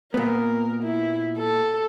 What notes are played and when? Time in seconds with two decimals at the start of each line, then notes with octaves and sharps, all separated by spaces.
0.14 A#2 B3 A#4
0.83 E4
1.37 A4